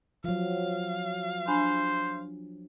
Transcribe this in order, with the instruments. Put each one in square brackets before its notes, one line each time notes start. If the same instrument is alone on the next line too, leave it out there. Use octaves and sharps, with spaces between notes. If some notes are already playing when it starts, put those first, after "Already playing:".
[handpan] F3 F#3 [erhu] F5
[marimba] D4 G#5 B5 [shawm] C5